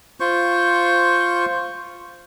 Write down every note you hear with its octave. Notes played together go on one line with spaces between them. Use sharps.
F4 C5 C#6